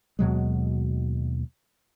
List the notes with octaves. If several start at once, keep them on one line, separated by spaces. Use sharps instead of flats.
D#2 B2 F#3 G#3